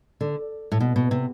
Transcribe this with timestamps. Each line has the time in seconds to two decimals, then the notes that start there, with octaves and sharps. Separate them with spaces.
0.21 D3
0.72 A2
0.80 B2
0.96 B2
1.11 C3